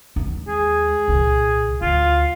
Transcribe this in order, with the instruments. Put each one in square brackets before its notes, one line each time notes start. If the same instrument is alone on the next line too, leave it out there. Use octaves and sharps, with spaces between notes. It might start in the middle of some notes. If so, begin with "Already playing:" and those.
[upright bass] D#2 G#3
[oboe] G#4
[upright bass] C2 A#2
[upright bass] D2 [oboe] F4